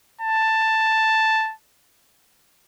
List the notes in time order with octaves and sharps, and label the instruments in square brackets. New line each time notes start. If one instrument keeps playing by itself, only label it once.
[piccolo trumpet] A5